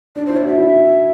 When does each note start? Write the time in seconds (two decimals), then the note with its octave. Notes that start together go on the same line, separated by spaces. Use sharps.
0.16 D4 D5
0.26 C5
0.29 E4
0.37 D5
0.44 F#4 E5
0.58 E4